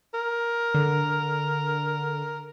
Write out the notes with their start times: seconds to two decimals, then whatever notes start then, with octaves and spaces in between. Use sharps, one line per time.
0.14 A#4
0.74 D3